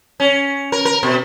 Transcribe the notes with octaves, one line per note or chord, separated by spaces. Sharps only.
C#4
A#4
A#4
B2